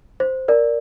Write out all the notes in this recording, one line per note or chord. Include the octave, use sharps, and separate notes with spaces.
C5
A#4 D5